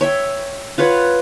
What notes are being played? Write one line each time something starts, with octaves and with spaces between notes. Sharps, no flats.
C#5 E5 G5
F4 B4 C#5 F#5